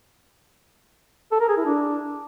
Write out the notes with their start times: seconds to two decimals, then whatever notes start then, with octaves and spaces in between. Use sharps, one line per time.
1.32 A4
1.40 A#4
1.49 G#4
1.57 E4
1.66 D4